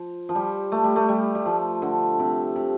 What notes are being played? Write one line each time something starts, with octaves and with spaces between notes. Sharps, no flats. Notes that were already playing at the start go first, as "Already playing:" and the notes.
Already playing: F3
F3
G3
A3
G3
A3
G3
G3
F3
D3
C3
C3